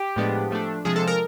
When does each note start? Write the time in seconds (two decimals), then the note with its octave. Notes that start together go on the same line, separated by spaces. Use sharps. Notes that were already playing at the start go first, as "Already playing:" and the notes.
Already playing: G4
0.16 A2 F3 G#3 B3 D4
0.51 F3 A3 D4
0.85 C3 F3 G#3 G#4
0.96 A4
1.08 A#4